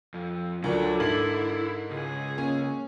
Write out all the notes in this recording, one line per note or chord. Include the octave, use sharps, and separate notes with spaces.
F2
D2 D3 F#3 F4 A#4 D5
G#2 E4 A#4 F#7
C#2 G#4
A#3 C#4